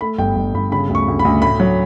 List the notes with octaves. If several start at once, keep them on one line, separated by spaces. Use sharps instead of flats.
A3 B5
G1 G5
G1
G1 B5
C#3 B5
D2
C#6
D2
B5
D2
A2 B5
F#3